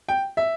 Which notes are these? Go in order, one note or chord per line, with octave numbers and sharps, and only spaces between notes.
G5
E5